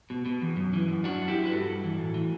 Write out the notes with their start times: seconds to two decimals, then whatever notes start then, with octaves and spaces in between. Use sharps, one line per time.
0.10 B2
0.25 B2
0.41 E2
0.56 F#2
0.73 E3
0.88 F#2
1.04 F#2 D4 F#4
1.19 F#2
1.28 E4 G4
1.36 F#2
1.45 B4
1.51 G2 F#4 A4
1.68 G2
1.84 E3
1.99 A2
2.14 E3